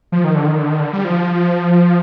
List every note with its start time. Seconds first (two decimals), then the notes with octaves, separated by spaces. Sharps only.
0.12 F3
0.24 D#3
0.35 D3
0.46 D#3
0.58 D3
0.70 D#3
0.80 D3
0.93 G3
1.05 F3